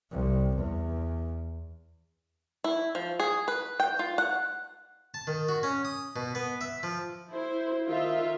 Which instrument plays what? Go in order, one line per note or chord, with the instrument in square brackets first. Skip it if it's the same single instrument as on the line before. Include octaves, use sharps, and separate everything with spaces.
[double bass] C2
E2
[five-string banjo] E4
F3
G#4
B4
G5
F4
F#5
[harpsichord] A5
D#3
F#4
C#4
D#6
B2
B3
E5
F3
[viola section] E4 C5
D#3 F4 E5